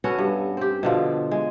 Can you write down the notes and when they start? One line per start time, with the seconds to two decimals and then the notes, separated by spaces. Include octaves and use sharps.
0.04 B3 C#4 F#4 A4
0.18 G2
0.57 C4 G4
0.83 B2 D3 F3
1.31 G#3